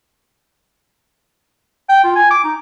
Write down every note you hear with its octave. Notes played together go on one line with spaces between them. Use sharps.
G5
F4
G#5
D6
D#4